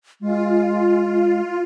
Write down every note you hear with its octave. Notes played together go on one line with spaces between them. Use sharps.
G#3 F4